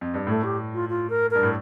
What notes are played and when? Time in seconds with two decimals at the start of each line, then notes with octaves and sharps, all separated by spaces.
0.01 F2
0.14 G2
0.27 A2 A3
0.43 G4
0.74 F4
0.89 F4
1.10 A#4
1.30 G2 A#4
1.43 A2